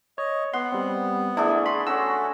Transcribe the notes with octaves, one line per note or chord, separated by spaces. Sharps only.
C#5 D#5
B3 F#5 C6
G3 C4
A3 D4 E4 G#4
B5 C6
C#4 F#4 A4 E6